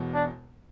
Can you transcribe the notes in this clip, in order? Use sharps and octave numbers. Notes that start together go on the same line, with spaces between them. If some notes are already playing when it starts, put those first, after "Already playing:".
Already playing: E1 E2 B2
D4